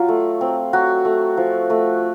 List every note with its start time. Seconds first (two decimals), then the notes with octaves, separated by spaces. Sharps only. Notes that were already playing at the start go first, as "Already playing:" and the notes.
Already playing: F#3 F4
0.08 A3
0.41 C4
0.73 F#3 F#4
1.05 A3
1.37 F3
1.70 A3